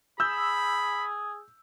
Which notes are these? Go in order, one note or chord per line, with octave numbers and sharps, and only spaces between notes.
G#4 B5 E6 G6